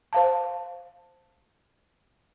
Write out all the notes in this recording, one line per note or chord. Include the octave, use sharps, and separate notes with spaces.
C5 F5 A5